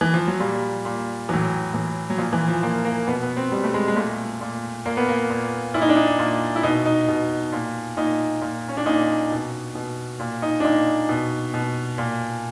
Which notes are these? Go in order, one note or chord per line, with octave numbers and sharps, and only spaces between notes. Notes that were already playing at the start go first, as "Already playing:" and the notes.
E3
F3
F#3
A#2 G3
A#2
A2 E3 F#3
A2 E3
F#3
A#2 F3
E3
F3
A#2 A#3
A#3
B2 B3
B3
C4
B2 G3
A3
G#3
G#3
A#2 A3
A#2
A#2 A#3
B3
A#3
A#2
A#2 E4
D#4
D4
D#4
A#2
E4
B2 D#4
D#4
B2
A#2
A#2 D#4
A#2
C#4
D4
A#2 D#4
B2
B2
A#2
D#4
D4
A#2 D#4
B2
B2
A#2